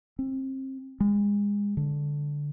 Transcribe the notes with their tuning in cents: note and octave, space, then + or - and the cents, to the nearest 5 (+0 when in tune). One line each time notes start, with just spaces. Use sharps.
C4 +30
G#3 -30
D3 -5